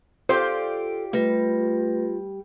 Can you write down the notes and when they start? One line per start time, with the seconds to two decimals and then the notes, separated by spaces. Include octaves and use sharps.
0.29 F4 G4 A4 C5 D5
1.13 G3 A3 F4 B4 A#6